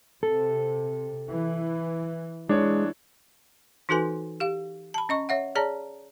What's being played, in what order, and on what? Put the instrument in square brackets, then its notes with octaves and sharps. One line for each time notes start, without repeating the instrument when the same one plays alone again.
[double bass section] C3 [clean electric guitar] A4
[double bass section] E3
[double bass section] E3 [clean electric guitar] G#3 [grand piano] D4 C#5
[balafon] E3 D#4 F#4 A4 B4 G#5
G4 F5
A5 B5
C#4 D#5 C#6
C#5 E5 F#5
G#4 C#5 D5 A5 A#5